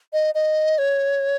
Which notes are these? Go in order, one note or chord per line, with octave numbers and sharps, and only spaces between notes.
D#5
D#5
C#5